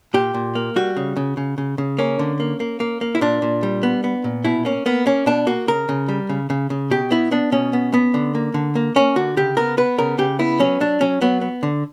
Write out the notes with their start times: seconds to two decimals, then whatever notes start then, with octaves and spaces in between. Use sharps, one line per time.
0.14 A#2 G4
0.34 A#2
0.55 A#3
0.76 G3 F#4
0.97 C#3
1.16 C#3
1.37 C#3
1.58 C#3
1.78 C#3
1.98 A#3 C#4
2.19 D3
2.40 A#3
2.60 A#3
2.80 A#3
3.01 A#3
3.15 E4
3.21 A#2 D4
3.42 A#2
3.63 G3
3.83 B3
4.04 B3
4.24 A#2
4.45 B2 E4
4.65 A#3 C#4
4.86 A#3 B3
5.06 A#3 C#4
5.26 B2 D4
5.47 A#3 F#4
5.68 C#3 A#4
5.89 C#3
6.09 G3
6.29 C#3
6.50 C#3
6.70 C#3
6.91 B2 G4
7.11 B3 E4
7.31 B3 D4
7.52 B2 C#4
7.73 B3
7.94 B3
8.14 D3
8.35 A#3
8.54 D3
8.75 A#3
8.96 A#3 C#4
9.16 D3 F#4
9.37 C#3 G4
9.57 B3 A#4
9.77 B3 B4
9.98 C#3 A#4
10.18 C#3 G4
10.39 B3 E4
10.59 F#3 C#4
10.80 F#3 D4
11.01 F#3 C#4
11.21 F#3 B3
11.41 B3
11.63 D3